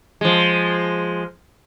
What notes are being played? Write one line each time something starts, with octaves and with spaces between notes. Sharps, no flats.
F3 G#3